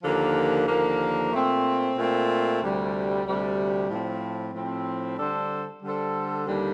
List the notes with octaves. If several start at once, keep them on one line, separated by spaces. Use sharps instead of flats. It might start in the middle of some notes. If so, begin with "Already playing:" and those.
D#2 D3 F3 A#3
D#2 D3 F3 A#3
A#2 A3 C4
A#2 A3 C4
D2 C3 G3
D2 C3 G3
A2 F3 C4
A2 F3 C4
D3 G3 D4 A4 C5
D3 G3 D4 A4 C5
D#2 D3 G3